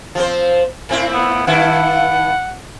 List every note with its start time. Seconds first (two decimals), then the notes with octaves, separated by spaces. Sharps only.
0.15 F3 C4 C5
0.89 A2 C4 E4
1.13 B3
1.47 G2 D#3 E4 F#5